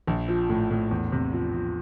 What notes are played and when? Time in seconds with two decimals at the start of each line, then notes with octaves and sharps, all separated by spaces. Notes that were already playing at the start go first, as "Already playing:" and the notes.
0.07 A#1
0.28 F3
0.49 A2
0.71 A2
0.91 E2
1.12 C3
1.33 F3
1.54 F3